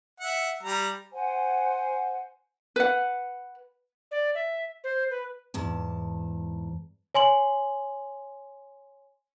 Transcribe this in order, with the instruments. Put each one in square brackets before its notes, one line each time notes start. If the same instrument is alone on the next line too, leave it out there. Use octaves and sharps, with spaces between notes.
[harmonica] E5 F#5
G3 A#5
[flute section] C5 F#5 G#5
[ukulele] B4 F#5
[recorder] D5
E5
C5
B4
[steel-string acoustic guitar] E2 G#2 A5
[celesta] C#5 G#5 C6 F#7